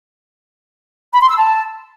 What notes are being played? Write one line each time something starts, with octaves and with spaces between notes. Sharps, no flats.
B5
C6
E6
A5